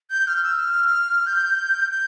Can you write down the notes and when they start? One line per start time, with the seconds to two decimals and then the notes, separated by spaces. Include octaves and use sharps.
0.10 G6
0.27 F6
0.43 E6
0.59 F6
1.26 G6
1.91 G6